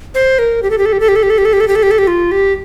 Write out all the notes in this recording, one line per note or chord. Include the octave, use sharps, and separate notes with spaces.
C5
A#4
G4
A4
G4
A4
G4
A4
G4
A4
G4
A4
G4
A4
G4
A4
G4
A4
G4
A4
G4
F4
G4